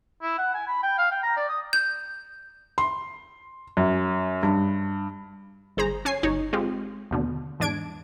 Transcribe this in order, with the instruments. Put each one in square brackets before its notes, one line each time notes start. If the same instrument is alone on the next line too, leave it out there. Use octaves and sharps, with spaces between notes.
[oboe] E4
F#5
G#5
B5
G5
F5
G5
A#5
D5
D#6
[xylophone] G6
[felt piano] C6
F#2
G2
[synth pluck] G1 G#4 C5 A#5
C#4 C#5 G#5 C7
G1 D#4 C#5
G#3 C4 F4 G4
D#2 B2 D3
E2 G#2 D4 G#6 D7